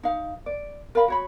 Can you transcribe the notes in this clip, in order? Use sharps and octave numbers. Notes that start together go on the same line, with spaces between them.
D#4 F5
D5
A#4 D5 F5 B5
F#4 C#5 B5